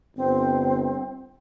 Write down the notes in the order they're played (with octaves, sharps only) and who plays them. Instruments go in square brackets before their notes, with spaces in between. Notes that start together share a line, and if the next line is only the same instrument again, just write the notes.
[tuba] G1 [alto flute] C4